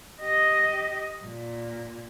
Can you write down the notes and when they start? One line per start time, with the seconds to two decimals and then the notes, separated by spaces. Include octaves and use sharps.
0.21 G4 D#5
1.25 A#2